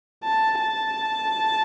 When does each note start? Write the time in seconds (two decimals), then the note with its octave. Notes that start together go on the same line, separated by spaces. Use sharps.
0.24 A5
0.61 A5